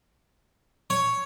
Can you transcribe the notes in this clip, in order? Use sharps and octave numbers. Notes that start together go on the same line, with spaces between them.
C#5